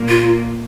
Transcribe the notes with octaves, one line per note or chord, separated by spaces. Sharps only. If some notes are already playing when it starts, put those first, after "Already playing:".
Already playing: A#2 A#3
F4